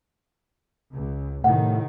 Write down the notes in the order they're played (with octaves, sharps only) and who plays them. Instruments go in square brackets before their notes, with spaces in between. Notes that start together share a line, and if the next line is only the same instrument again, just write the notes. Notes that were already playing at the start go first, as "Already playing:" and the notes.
[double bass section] C#2
[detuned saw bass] A2 [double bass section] C3 D#3 [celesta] F#5